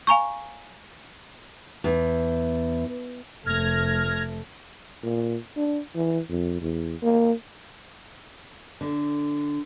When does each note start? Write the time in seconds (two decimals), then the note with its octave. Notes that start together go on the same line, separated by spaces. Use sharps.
0.07 F5 G#5 A#5 C#6
1.84 E2
3.46 F1 A3 F6 G#6 A#6
5.03 A#2
5.57 D4
5.96 E3
6.29 F2
6.61 E2
7.03 A#3
8.81 D3